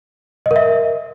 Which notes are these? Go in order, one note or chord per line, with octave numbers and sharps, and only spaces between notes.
D#5
A#4
E5